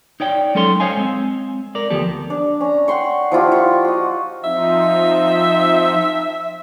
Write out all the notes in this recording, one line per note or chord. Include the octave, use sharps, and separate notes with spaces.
D#4 C#5 D5 G5
F#3 G#3 C#4 A4 C#5 C6
C5 C#5 D#5 F5 G#5
G#3 C4
A#4 D5
D2 F3 B3 G4 A4
D4
C#4 A#5
F#5 G5 C6 C#6
F3 E4 F4 G4
F4 C#6
F#4 D#5
F3 C4 D#4 E5